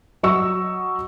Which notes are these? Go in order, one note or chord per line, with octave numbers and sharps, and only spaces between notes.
F#3 D#5 C#6 E6